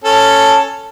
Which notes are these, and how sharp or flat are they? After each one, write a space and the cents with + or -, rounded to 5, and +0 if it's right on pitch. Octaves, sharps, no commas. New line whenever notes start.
C#4 +0 A4 +5